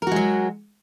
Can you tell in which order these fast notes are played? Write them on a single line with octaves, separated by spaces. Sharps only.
A#4 F#4 G#3 F#3